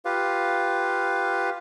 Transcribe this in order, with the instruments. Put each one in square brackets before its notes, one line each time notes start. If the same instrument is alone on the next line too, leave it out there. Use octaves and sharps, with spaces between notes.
[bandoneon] F4 G4 B4 F5